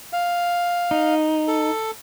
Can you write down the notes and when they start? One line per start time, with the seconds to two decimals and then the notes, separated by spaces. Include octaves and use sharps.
0.13 F5
0.91 D#4
1.48 A4